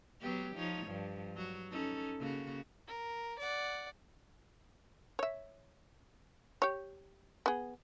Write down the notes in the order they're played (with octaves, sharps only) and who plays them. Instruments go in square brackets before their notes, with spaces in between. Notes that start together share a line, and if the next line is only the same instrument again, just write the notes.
[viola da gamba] F#3 B3 G4
F3 D#4 C#5
G2 F3
F#3 F#4
C#4 D#4 A4
C#3 A#3 F#4
[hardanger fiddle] A#4
D5 F#5
[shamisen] C#5 E5
G4 C#5
B3 G#4